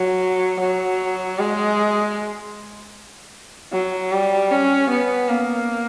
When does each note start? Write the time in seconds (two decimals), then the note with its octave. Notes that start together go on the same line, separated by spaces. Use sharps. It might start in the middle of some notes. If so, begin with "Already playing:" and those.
Already playing: F#3
0.61 F#3
1.39 G#3
3.72 F#3
4.12 G3
4.51 C#4
4.90 B3
5.29 A#3